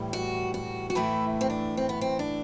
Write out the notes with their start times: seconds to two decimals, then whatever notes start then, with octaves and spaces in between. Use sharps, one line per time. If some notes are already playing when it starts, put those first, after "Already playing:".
Already playing: A2 E3 G3
0.13 F#4
0.54 F#4
0.90 F#4
0.95 A2 E3 A3 E4
1.41 C4
1.50 D4
1.77 C4
1.89 B3
2.01 C4
2.19 D4